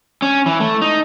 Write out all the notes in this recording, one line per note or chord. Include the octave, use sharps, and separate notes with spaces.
C#4
E3
A3
D#4